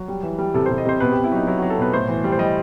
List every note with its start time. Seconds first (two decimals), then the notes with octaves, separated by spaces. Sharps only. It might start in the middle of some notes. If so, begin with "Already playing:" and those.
Already playing: F#3
0.08 G3
0.23 E3
0.39 G3
0.54 C3 A4
0.66 C3 C5
0.78 D#5
0.85 C3 C5
1.00 B2 B4
1.12 B2 G4
1.24 E4
1.32 F#3 D#4
1.47 F#3 E4
1.58 F#3 F#4
1.70 A4
1.78 B2 B4
1.93 A2 C5
2.08 E3
2.24 G3
2.32 C5
2.39 G3 D#5